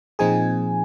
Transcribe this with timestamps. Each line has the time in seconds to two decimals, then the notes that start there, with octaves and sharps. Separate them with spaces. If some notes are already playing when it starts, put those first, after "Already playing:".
0.19 A#2 F3 C4 D#4 G#4 G#5